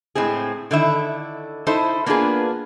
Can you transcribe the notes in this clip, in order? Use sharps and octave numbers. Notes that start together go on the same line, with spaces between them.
A2 G#3 C4 G#4
D3 D#3 E4 E5
D#4 E4 A4 C5
A#3 B3 D4 F4 G#4 B4